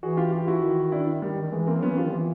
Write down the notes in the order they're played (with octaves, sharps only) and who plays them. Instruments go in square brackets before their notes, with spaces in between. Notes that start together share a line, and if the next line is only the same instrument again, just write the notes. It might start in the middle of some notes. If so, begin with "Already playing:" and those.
[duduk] E3 [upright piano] F#4 G#4
[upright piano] F4 G4
F4 G4
E4 F#4
[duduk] D#3
[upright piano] D4 E4
[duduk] D#3 [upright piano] G3
[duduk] D#3
[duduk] E3 [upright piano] G#3
[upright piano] A#3 C4
[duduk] F#3 [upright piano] B3 C#4
[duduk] E3
[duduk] F3 [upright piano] F4 G4
[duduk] D#3
E3